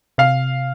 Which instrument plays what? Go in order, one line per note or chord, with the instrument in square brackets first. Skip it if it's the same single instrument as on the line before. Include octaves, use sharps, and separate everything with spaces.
[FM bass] C3 [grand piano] F5